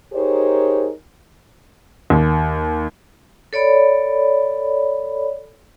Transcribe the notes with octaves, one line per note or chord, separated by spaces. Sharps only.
D#4 G4 G#4 A#4 C5 C#5
D#2
A4 C#5 D5 B5